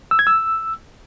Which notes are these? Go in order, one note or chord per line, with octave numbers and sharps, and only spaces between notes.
E6
G#6
E6